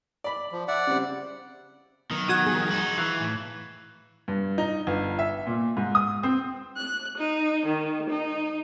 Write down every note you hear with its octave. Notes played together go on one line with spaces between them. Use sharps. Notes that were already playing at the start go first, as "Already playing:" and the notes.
D5 B5
F3
D5 E5 F#5
C#3 G3 C4
D#3 F#3 B3
F#4 D#6 F#6 G#6 E7
F3 G3 G#4
D#4 F#4
E3 F5 C#6 F#6
A2
G2
D#4
G1
E5
A#2
G#2
D#6
C4
F#6
D#4
D#3
D#4